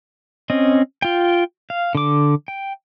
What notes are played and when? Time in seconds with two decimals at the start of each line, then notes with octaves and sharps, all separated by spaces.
0.50 C4 C#4 D#5
1.02 F4 G5
1.70 F5
1.95 D3 D6
2.48 G5